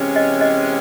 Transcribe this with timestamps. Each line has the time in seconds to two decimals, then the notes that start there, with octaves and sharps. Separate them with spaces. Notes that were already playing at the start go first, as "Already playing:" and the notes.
Already playing: C3 E3 G#3 C#4
0.16 D#5
0.41 D#5